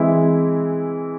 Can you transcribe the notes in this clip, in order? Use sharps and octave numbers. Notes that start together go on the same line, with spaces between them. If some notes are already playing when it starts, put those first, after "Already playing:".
Already playing: E3 G#3 C4 E4